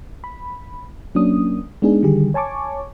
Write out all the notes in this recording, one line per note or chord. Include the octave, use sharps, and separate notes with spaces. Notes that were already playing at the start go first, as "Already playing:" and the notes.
B5
F#3 A#3 C#4 D4 D#6
G#3 B3 D4 D#4 G#4
D3 D#3 G3 G4 G#4
C#5 G#5 A5 C#6 D6